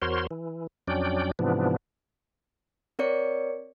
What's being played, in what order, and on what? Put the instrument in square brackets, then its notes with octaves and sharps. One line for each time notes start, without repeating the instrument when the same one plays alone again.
[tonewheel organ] E2 F#4 A#4 C5 C#5 C6
E3
F2 F#3 C#4 D4 D5 G5
G#2 C3 E3 F3 B3 D4
[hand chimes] C4 A#4 C#5 D5 C#7